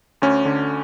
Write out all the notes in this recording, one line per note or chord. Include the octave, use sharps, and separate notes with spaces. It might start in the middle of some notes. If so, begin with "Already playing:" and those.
D2 C#4
D3